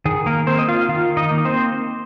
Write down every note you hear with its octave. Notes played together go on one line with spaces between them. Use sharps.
D#3 G#4
A#3 A#4
A#3 C4 C5
D#5
F4 F5
D#3 F4 F5
D#4 D#5
A#3
C4 C5